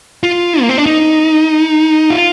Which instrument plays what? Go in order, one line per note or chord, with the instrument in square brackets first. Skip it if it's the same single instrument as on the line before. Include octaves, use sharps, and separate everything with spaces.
[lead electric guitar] F4
A#3
C4
D4
D#4
F4